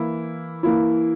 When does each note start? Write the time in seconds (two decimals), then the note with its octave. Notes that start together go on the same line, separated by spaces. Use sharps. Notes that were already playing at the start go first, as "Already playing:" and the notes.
Already playing: E3 A#3 E4
0.63 E3 A#3 E4